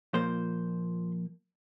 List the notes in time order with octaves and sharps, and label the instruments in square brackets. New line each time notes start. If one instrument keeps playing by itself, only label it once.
[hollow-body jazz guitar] A#2 F3 A#3 C5